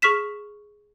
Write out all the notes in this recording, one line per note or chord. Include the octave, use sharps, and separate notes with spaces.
G#4 C#6 F6 B6 E7